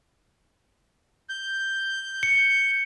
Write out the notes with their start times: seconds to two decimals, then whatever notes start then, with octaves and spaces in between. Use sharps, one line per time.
1.29 G6
2.23 C#7